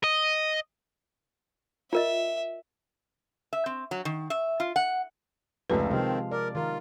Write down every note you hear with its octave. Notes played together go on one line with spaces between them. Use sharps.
D#5
F4 A#4 D#5 E5
E5
C4
F#3
D#3
E5
F4
F#5
F1 C#2 A3 F4 B4
C3 D#3 F3 G#3 C4 F5
A#4 D5
D#3 F4 A#4